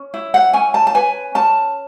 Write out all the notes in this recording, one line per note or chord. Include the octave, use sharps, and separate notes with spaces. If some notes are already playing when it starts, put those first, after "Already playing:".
Already playing: C#4
E4
F#5
C#4 G#5
A5
A5
B4 G#5
C#4 A5